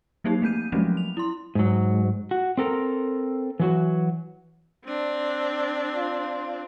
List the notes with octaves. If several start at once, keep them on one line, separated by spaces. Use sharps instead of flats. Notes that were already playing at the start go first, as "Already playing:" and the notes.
F3 F#3 A#3 D#4 G4
A3 C4 G6 D#7
F3 F#3 G#3 A3 C4 C#4
F7
E4 C6
G#2 F#3
F#4
C4 A4 A#4
E3 F#3 F#4
C4 D4
F4